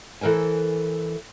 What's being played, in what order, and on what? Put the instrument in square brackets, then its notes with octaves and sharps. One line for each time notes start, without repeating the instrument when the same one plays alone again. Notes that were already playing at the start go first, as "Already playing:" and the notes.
[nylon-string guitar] E3 A4 A#4 C5 G#5